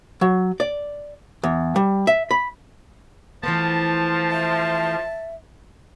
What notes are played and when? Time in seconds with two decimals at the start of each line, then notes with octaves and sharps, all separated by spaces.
0.21 F#3
0.60 D5
1.44 E2
1.76 G3
2.07 E5
2.31 B5
3.43 E3 F3 A3 B3 A5
4.31 E5